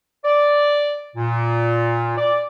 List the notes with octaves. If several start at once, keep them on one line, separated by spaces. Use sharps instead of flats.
D5
A#2
D5